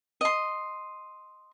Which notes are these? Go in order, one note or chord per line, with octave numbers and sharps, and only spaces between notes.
D#5 C6